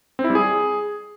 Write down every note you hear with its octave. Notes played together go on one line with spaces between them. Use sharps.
C4
E4
G3
G#4